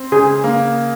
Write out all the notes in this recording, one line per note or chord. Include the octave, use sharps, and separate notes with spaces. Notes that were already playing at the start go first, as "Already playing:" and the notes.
Already playing: C4
C#3 G#4
A#3